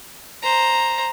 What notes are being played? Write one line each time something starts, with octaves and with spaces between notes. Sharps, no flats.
C5 A#5